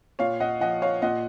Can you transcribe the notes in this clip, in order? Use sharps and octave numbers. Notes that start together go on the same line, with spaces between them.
A#2 C#5 F5
D#5 F#5
F3 D#5 F#5
C#5 F5
A#2 D#5 F#5